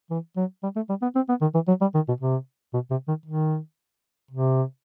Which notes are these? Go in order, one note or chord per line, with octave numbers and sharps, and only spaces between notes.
E3
F#3
G3
A3
G3
B3
C4
B3
D#3
E3
F#3
G3
D#3
B2
C3
B2
C3
D#3
D#3
C3